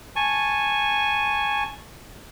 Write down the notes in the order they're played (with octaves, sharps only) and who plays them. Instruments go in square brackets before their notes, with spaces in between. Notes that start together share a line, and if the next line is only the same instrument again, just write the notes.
[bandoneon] G#5 A5 C#6